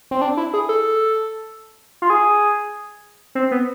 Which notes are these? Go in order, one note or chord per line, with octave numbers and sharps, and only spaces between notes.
C4
D4
E4
G#4
A4
F4
G#4
C4
B3